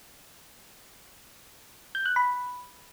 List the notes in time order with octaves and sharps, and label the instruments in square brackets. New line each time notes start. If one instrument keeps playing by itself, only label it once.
[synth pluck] G6
F#6
B5